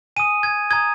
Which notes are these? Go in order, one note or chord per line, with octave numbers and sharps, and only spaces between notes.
G#5 D#6 D#7
G#6
A#5 D#6 G#6